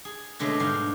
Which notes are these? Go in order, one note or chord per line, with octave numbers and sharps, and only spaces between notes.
G#4
B2 D3 G#3 A3 C#4
G#2 D3 G3 F5